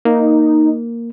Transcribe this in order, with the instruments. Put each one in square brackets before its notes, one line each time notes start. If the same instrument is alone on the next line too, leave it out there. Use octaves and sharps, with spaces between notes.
[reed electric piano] A#3 [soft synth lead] D#4